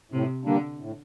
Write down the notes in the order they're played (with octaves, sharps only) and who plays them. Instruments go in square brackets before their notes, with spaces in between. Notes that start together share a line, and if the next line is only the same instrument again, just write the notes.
[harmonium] A2 [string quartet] C3
[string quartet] D3 [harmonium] G3 A#3 D4
[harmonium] A2